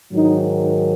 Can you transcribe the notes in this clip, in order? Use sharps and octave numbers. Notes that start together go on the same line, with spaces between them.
G#2 D#3 F#3 D#4